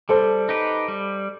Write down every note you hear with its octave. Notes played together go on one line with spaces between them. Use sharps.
G3 A4 C5
D#4 G4 B4
G3